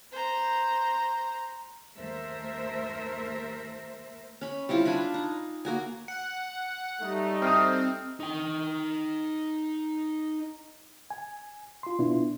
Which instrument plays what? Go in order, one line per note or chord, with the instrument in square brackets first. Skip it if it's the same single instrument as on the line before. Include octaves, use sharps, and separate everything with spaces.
[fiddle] C5 A#5
[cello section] D#2 A3 A#4 C5 E5
[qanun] C#4 B5
G3 C4 E4 F4
D4 F4 G#5 B5
D#4
A#3 F#4 G#5
[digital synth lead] F#5
[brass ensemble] G3 A3 D#4
[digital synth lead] C4 [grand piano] D#6 F6
[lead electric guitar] D#4 G5
[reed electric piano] G#5
F4 C6
B2 B3 D4 E4 F4